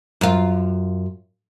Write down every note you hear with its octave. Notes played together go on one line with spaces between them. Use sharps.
F#2 F4